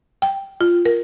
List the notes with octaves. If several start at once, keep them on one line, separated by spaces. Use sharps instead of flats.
G5
F4
A#4